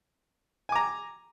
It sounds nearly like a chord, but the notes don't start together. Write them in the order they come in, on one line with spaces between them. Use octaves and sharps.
G#5 D6 A#5